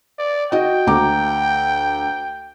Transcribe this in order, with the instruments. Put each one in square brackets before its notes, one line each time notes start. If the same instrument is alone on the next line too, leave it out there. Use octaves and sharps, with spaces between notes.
[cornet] D5
[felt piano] F#4 D#5 [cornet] G5
[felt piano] D2 A#5 D6